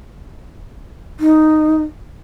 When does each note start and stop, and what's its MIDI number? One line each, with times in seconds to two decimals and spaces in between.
1.20 1.83 63